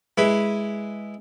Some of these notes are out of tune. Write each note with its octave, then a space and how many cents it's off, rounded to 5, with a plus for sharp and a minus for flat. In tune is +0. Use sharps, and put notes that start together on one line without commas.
G#3 +0 E4 +0 B4 +0